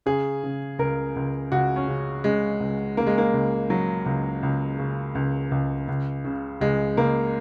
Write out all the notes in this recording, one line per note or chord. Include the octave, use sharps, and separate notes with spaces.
C#3 G#4
C#3
C#2 A#4
C#2
C#2 F#4
C#4
C#3
C#3 G#3
C#2
C#3 A#3
G#3
A#3
C#2
C#3 F#3
C#2
C#2
C#3
C#2
C#2
C#2
C#3
C#2 G#3
C#2 A#3